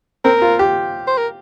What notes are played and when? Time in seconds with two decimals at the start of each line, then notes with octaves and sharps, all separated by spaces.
0.25 C4 A#4
0.42 F4
0.59 G4
1.07 C5
1.17 A#4